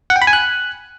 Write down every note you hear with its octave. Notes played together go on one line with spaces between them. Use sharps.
F#5
G5
B5
G#5
F#6